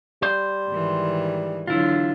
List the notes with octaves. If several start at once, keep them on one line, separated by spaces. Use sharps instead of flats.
G3 C5
G#2 D#3 E3
D3 F#3 E4 F4